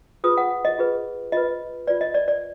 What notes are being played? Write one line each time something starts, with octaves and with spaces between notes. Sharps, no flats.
F4 G#4 B4 D#6
F#5
D#5
F4 G#4 B4
F4 B4 D#5
F4 B4 D5
D#5
D5
D5